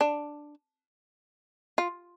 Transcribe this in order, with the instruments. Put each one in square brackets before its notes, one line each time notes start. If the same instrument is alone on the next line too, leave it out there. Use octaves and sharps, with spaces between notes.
[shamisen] D4
F4